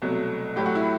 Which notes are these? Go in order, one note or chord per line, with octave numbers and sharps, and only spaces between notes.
C2 B2 F#3 A3
A2 F#3 A3 G4
F#4
E4